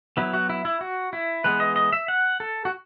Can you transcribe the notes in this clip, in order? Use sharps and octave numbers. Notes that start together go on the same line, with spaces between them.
F#3 B3 E4
F#4
E4
E4
F#4
E4
E3 G#3 B3 B4
D#5
D#5
E5
F#5
A4
F#4